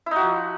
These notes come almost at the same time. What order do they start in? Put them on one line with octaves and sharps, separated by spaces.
E4 D#4 F#4 F3